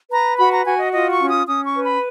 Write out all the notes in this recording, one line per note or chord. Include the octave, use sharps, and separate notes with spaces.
B4 A#5
F#4 B5
A#5
F#4 G#5
D#5
F4 D#5
C#6
C#4
D#6
C#4 D#6
C#6
B4
B5